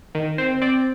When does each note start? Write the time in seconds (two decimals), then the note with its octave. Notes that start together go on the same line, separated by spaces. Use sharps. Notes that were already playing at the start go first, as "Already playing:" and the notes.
0.15 D#3
0.38 C4 C5
0.62 C4 D5